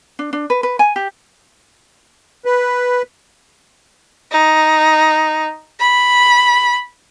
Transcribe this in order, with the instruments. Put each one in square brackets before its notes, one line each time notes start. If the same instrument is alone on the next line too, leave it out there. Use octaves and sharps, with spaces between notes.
[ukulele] D4
D4
B4
B4
G#5
G4
[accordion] B4
[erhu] D#4
B5